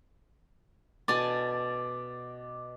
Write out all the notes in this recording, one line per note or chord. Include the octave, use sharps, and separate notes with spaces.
B2 D5 G#5 A5